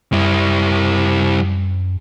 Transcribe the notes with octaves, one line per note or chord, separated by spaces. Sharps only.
F#2 G3 E4